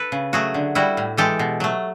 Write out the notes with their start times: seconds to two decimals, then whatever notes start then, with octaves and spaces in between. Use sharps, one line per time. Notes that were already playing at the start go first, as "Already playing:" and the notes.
Already playing: A4 B4
0.12 C#3
0.33 F#3 A3 F#4 G#4
0.54 D3
0.75 G3 E4 F#4
0.97 A2
1.17 E3 G#3 G4 A4
1.39 B2
1.60 F#3 A3